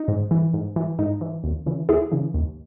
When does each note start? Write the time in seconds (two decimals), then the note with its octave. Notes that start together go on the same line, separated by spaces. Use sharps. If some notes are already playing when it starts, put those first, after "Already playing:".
Already playing: D#4
0.08 G#2
0.31 E3
0.53 G#2
0.76 E3
0.99 G#2 D#4
1.21 E3
1.44 D#2
1.66 C#3 E3
1.89 D#2 E4 G#4
2.12 C#3 E3
2.34 D#2